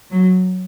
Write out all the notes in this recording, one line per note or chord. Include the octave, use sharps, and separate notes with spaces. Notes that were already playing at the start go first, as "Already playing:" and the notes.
F#3